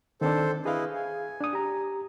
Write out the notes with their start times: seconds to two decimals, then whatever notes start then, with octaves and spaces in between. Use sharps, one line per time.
0.21 D#3 C4 D4 A4 C5
0.65 E4 G#4 B4 D#5 F5
0.95 G#5
1.41 D4 D#6
1.53 G4 A#5